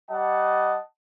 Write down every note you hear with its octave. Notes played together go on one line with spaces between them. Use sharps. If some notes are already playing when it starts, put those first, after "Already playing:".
G3 D#5 F#5 A5